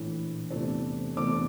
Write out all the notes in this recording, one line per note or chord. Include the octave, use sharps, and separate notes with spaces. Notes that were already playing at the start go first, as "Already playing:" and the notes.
Already playing: A#1 A2 E3
E2 C3 E3 A3 D4
E2 C3 E3 A3 D4 D6